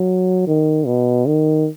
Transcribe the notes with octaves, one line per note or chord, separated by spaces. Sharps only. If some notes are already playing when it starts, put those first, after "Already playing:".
Already playing: F#3
D#3
B2
D#3